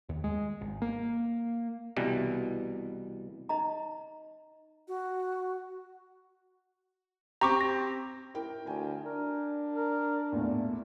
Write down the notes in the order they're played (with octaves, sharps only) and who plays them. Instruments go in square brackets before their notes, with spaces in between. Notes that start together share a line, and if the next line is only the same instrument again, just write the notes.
[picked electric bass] D#2
G#3
G#1
A#3
[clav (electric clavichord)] C2 B2 E3 G3
[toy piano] D#4 D#5 A#5
[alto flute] F#4
[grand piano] C4 G4 [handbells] A#5 C#6 D6
[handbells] A#6
[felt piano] E4 A#4 G5
[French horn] D2 [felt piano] G5 G#5
[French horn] D4 [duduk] A#4
[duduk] A#4
[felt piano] E2 A#2 [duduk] A3